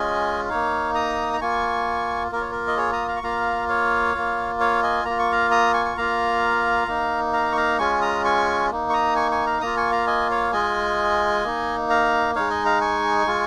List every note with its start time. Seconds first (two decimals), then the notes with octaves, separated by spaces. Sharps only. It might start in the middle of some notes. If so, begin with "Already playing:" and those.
Already playing: G#3 C#4 F4 D#5 G#5
0.49 A#3 D#4 C#5 F5
0.95 A#5 D#6
1.33 A#5
1.41 A#3 F4 G#5 C#6
2.32 A#3 F4 A#4
2.41 C#5
2.51 A#4
2.68 D#5
2.77 G#4 C#5
2.92 A#5 D#6
3.08 F5 A#5
3.16 C#6
3.23 A#3 F4 F5 A#5
3.69 C#5 F5
4.15 A#3 F4
4.60 C#5 F5
4.83 D#5 G#5
5.05 A#3 F4 A#5
5.19 C#6
5.32 F5 A#5
5.51 A#5 D#6
5.74 G#5 C#6
5.85 C#6
5.97 A#3 F4 F5 A#5
6.88 A#3 D#4
7.33 F5 A#5
7.52 C#6
7.56 F5 A#5
7.79 G#3 C#4 F4 G#5 C#6
8.01 A#5 D#6
8.25 G#5 C#6
8.71 A#3 D#4
8.90 C#6
8.93 A#5 D#6
9.15 G#5 C#6
9.31 G#5 C#6
9.46 F5 A#5
9.61 A#3 F4 A#5 D#6
9.77 G#5 C#6
9.91 F5 A#5
10.07 D#5 G#5
10.30 C#5 F5
10.52 G#3 F4 D#5 G#5
11.44 A#3 D#4
11.90 F5 A#5
12.35 G#3 D#4 C#5 F5
12.50 D#5 G#5
12.65 F5 A#5
12.81 G#5 C#6
13.27 G#3 F4